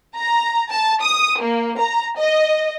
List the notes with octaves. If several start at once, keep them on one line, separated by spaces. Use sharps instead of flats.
A#5
A5
D#6
A#3
A#5
D#5